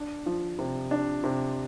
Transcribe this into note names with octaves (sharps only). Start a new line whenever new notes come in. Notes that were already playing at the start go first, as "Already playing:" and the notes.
Already playing: D4
F3
C3
D4
C3